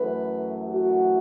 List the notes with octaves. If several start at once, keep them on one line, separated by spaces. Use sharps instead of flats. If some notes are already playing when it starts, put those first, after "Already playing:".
Already playing: F#2 E3 A3 B4
F#4